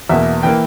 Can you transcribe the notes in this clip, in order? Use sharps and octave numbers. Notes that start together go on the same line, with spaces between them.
E2 B2 A#3 E5
E3 A#3 G5